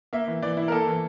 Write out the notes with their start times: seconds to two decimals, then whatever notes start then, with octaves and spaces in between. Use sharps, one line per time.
0.13 A#3 E5
0.28 E3
0.42 E3 D5
0.57 E4
0.68 A#4
0.72 A#3 A4
0.87 E3